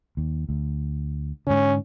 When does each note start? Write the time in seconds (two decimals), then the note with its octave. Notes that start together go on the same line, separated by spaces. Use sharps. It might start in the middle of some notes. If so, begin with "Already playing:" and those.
0.17 D#2
0.49 D2
1.47 G#2 D3 C#4